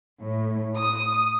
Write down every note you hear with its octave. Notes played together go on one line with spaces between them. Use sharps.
A2
D#6